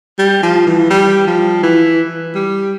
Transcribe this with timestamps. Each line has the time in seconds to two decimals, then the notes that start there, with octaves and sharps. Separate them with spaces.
0.19 G3
0.43 F3
0.67 E3
0.90 G3
1.28 F3
1.63 E3
2.35 G3